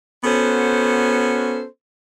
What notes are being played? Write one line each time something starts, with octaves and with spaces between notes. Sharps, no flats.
B3 C#4 F#4 A4 C5